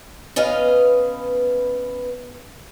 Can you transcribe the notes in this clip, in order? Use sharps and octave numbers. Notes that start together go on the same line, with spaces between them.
B3 C#4 B4 D#5 F5